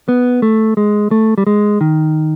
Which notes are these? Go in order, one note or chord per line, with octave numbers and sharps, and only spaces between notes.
B3
A3
G#3
A3
G3
G#3
D#3